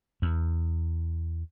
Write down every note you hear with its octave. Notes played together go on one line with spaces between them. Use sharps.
E2